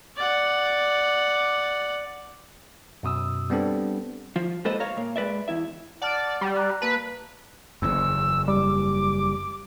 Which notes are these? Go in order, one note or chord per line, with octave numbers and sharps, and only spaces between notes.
D5 F#5
F#2 B2 D#6 E6
G3 B3 C4 D4 A4
F3 F4
G#3 A#3 A4 B4 C5 D#5
C#5 F5 A#5
A#2 A#3
G#3 B4 D5 E5
E2 E4 E5
D5 F#5 A5 F6
D6
G3
A#5 F#6
A#3 B4 A5
F#1 E2 E6
G3 D6